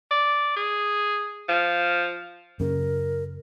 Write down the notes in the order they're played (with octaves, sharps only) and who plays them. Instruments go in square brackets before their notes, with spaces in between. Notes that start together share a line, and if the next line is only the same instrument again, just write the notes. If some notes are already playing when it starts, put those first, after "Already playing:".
[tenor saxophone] D5
G#4
F3
[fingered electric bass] F#2 C#3 [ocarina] A#4